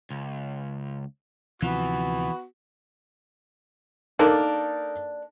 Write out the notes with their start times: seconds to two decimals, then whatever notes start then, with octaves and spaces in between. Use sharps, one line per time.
0.11 C#2
1.62 D2 C3 E3 F3 B3 F#4
4.19 A#3 D4 D#4 A4 A#4